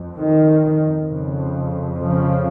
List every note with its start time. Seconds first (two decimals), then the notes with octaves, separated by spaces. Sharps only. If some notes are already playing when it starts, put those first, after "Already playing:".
Already playing: F2
0.16 D#3
1.09 F2 C#3
2.00 C#3 F3